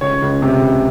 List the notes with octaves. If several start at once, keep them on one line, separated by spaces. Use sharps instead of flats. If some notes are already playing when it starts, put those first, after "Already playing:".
C#2 C#5
C#2
C3
C#2